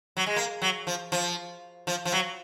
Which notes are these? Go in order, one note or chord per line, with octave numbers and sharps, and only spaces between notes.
F#3
G#3
A#3
F#3
F3
F3
F3
F3
F#3